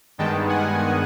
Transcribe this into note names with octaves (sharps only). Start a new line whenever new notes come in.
G2 D#3 G#3 B3 G5 A5
F#5 G#5